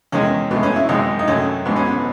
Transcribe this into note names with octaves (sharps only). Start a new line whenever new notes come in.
E2 D#3 G#3 C#4
G#2 F#3 A3 B3
C#4
E4
G#1 F#2 D#3 G#3 D#4
D#4
F#2 D#3 F#3 A3 C#4
A1 G#2 F#3 B3
C#4
B3